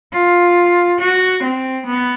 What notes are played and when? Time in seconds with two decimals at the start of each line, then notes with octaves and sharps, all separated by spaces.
0.13 F4
1.00 F#4
1.43 C4
1.86 B3